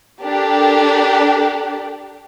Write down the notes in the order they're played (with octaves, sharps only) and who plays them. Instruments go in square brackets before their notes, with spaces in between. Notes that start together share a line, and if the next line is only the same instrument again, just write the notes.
[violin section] D4 G4 A4 A#4 D5